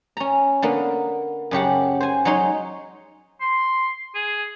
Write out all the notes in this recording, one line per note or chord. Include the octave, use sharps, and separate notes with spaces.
C#4 A#5
D3 A#3 B3
F#2 C#3 G4 F#5
C5 G#5
F#3 G#3 D#4 C#5 C6
C6
G#4